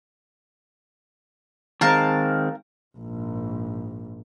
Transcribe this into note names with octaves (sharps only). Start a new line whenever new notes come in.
D#3 G#3 C4 A#4 F5 A5
A#1 G#2